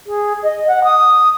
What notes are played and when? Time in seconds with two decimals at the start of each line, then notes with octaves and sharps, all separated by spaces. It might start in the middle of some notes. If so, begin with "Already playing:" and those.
0.06 G#4
0.43 D#5
0.67 F#5
0.83 D#6